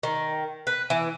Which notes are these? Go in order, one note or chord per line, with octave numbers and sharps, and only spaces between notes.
D#3
B4
E3